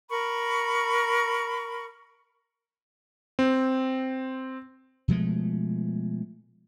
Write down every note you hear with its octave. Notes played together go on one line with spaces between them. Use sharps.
A#4 B5 C#6
C4
B2 F3 G#3 A3